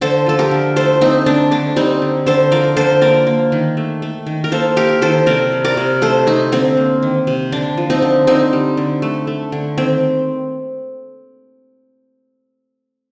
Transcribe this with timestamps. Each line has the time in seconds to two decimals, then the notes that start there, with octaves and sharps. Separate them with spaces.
0.01 D3 A4 C5
0.26 F3 A4
0.39 G4 A#4
0.51 D3
0.76 A3 A4 C5
1.01 A3 C4 D#4
1.26 D3 D4
1.51 D3 D4
1.76 G3 C4 D#4
2.02 D3
2.26 D3 A4 C5
2.51 F3 A#4 D5
2.77 D3 A4 C5
3.01 A#3 A#4 D5
3.27 A#3
3.52 D#3
3.77 A3
4.02 A3
4.26 D#3
4.44 A#4
4.52 A#3 A4 C5
4.76 A#3 G4 A#4
5.02 D#3 A4 C5
5.26 C3 A#4 D5
5.52 G3
5.64 A#4 D5
5.77 C3
6.02 A3 A4 C5
6.27 A3 C4 D#4
6.52 D3 C4
6.77 A#3
7.02 D#3
7.27 C3
7.52 D3 D4
7.77 F3
7.90 C4 D#4
8.02 D3
8.27 D3 C4 D#4
8.53 G3
8.77 D3
9.02 A3
9.27 A3
9.52 D3
9.78 D#3 C4